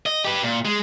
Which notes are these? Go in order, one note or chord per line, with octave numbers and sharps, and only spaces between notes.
D#5
G4 B4
A#2
G#3